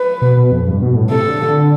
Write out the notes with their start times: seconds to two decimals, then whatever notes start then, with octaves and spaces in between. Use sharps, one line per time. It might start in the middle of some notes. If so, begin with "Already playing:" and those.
Already playing: B4
0.22 B2
0.37 B2
0.52 F2
0.67 G2
0.82 B2
0.96 A2
1.10 C3 A4
1.26 D3